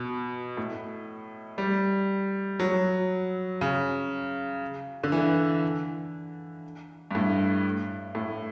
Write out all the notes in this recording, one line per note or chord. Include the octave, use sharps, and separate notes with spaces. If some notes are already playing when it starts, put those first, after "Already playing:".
Already playing: B2
A2
G3
F#3
C#3
D3
E3
G2
A2
A2